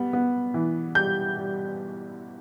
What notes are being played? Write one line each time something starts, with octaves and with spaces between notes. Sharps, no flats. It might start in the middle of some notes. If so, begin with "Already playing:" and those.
Already playing: G3 B3
B3
E3
G3 G6
G3